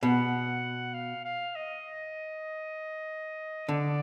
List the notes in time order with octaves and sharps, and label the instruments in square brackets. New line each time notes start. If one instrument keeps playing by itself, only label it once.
[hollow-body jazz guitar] B2 [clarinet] F#5
[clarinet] F5
F5
D#5
[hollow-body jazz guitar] D3 [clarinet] D5